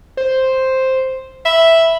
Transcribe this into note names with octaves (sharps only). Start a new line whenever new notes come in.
C5
E5 B5